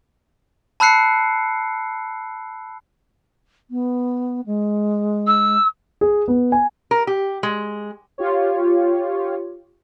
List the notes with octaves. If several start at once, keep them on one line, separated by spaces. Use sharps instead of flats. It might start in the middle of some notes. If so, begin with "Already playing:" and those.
A5 B5 E6 F#6 C7 C#7
B3
G#3
E6
G#4
B3
G#5
A#4
G4
G#3
F4 G4 C#5